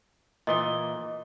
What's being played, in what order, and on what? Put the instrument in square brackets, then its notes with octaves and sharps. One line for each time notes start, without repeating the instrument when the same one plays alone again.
[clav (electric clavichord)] A#2 E3 [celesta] D#5 D#6 G7